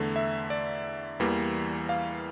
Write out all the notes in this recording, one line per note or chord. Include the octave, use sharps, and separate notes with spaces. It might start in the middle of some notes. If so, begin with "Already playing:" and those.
Already playing: E2 D3 A3
E5
D5
E2 E3 G3 A#3
F5